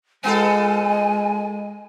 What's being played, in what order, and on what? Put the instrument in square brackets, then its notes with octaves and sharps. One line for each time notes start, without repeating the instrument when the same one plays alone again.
[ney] G#3 [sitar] B3 F4 A4 [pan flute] G#5